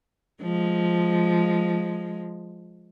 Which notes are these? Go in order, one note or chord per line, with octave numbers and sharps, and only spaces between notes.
F3 G#3